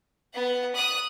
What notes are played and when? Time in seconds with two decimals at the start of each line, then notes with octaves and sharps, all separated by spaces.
0.34 B3 F#5
0.75 D#6 F#6